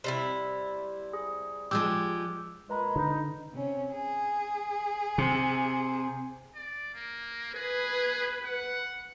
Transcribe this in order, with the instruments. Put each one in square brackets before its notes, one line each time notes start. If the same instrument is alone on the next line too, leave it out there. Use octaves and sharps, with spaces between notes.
[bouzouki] C3 G3 E4
[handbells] G#4
[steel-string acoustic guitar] F3 G#3 G4 [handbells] D6 E6 G6
[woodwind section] A#2 G#3 [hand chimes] B4 A#5 B5
[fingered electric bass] D3 [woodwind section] D#4
[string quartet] C3 C#4
G#4
[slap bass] C3
[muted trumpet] D5
A#3
[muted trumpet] G#4 [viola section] B4
[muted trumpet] F#5